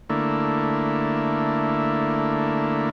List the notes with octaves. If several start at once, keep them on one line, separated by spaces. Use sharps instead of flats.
D3 A3 A#3 E4